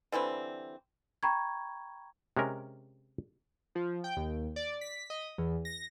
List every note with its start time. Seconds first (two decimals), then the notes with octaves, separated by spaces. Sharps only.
0.12 D3 E3 G3 C4
1.23 G5 A#5 B5 C#6 G#6
2.37 C3 G#3 C#4 A#4
3.75 F3
4.04 G5
4.17 D#2
4.56 D5
4.81 B6
5.10 D#5
5.38 E2
5.65 A#6